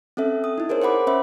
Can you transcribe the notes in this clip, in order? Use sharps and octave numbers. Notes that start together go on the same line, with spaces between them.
C4 C#4 A4 E5
D#6
D#4 E4
G#4 A#4 C5 C#5
C5 C#5 F#5 B5 D6
C#4 C5 E5 B5